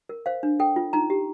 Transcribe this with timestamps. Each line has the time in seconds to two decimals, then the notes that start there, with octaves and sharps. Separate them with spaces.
0.09 A#4
0.26 C5 F5
0.43 D4
0.60 A4 G5
0.76 F4
0.93 D#4 A#5
1.10 G4